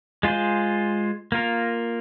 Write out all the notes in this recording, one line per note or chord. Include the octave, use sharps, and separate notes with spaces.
G#3 F4 G#4 C5
A#3 F4 A#4